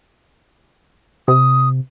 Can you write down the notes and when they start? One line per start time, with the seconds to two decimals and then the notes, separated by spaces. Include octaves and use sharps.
1.28 C3 D#6